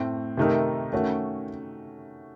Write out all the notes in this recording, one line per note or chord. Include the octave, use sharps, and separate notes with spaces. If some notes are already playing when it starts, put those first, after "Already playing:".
Already playing: A2 A3 C4
C3 D#3 A3 D#4 A#4
D#3 A3 C#4 F#4